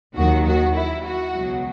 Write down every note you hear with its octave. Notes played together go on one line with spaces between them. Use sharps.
D#2 D#3 F#3 F#4
F#4
E4
F#4
C#2 B2 F#3